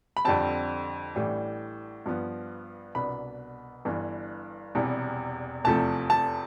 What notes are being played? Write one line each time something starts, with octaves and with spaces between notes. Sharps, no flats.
B5
F2 D3 G3 C4 A5
A1 A2 E3 G3 D4
G2 F3 B3
C2 B2 B3 D4 B5
G1 G2 E3
E1 E2 C3 G3
F1 E2 C3 F3 A3 A5
A5